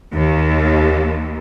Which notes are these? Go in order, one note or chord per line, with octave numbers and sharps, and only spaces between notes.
D#2